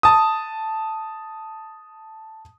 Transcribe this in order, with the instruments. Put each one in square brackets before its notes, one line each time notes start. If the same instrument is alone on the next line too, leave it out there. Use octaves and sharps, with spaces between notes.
[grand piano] A5 D#6